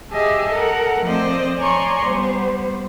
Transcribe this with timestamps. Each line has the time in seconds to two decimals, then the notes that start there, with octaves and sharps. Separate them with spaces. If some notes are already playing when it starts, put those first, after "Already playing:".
0.11 G4 G#4 D#5 E5 G#5 A5
0.52 A4 A#4 F#5
1.05 F3 A3 C4 C5 D5 D#5
1.58 C#5 D5 G#5 A#5 C6 C#6
2.06 G3 B3 C5